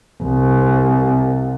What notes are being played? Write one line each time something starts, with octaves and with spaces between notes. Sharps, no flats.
C2